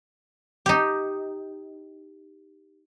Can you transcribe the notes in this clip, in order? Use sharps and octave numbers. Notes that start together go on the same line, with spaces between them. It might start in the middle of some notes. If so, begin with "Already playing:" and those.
D#4 G4